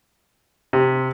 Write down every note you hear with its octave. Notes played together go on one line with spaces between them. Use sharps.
C3